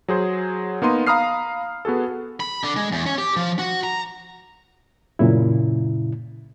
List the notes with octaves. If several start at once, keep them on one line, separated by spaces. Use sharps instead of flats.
F#3 G#4 C5
A#3 B3 D#4 C6 D#7
F5 A#5 B5 D#6 F6 C7
B3 F#4 G#4 A4
B5
D3
G#3
E2
C#4
G4
F3
F#4
A#5
F#2 A#2 C#3 E4